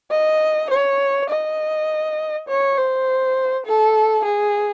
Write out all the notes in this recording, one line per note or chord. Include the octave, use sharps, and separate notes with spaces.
D#5
C#5
D#5
C#5
C5
A4
G#4